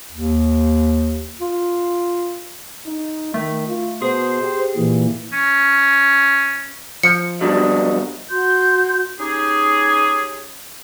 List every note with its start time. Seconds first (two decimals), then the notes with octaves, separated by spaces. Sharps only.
0.12 D#2
1.41 F4
2.86 D#4
3.34 D#3 A3
3.68 F4
4.02 B2 G#4 C5
4.42 G4
4.77 A#2 E3
5.33 C#4
7.03 F3 C#7
7.41 G2 D3 F#3 D#5
8.30 F#4 C6 G6
9.19 C#4 D#4 G4 G#4